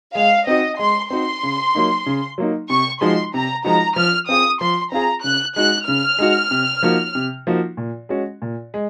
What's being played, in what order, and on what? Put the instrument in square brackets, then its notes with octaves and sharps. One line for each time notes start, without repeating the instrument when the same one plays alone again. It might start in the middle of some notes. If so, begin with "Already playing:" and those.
[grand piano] G#3 [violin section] F5
[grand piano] C4 D#4 F#4 [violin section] D#5
[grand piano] G#3 [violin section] C6
[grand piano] C4 D#4 F#4 [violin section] C6
[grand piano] C#3
F#3 A#3 D#4
C#3
F#3 A#3 D#4
[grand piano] C3 [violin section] C#6
[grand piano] F3 G#3 D#4 F#4 [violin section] C6
[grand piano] C3 [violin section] A#5
[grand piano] F3 G#3 D#4 F#4 [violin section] A#5
[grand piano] F3 [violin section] F6
[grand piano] C4 F4 G#4 [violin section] D#6
[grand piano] F3 [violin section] C6
[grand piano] C4 F4 G#4 [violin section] A#5
[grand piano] C#3 [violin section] F#6
[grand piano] G#3 D#4 F#4 [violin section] F#6
[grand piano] C#3 [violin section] F6
[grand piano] G#3 D#4 F#4
C3
F3 A#3 D#4 F#4
C3
F3 A#3 D#4 F#4
A#2
G#3 C#4 F#4
A#2
G#3